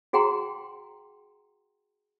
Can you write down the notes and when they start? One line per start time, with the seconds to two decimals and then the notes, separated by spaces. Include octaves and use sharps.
0.13 F#4 G#4 F#5 G5 A#5 C6